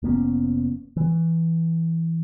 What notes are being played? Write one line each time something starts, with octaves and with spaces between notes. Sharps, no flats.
F1 A#3 B3 C#4
E3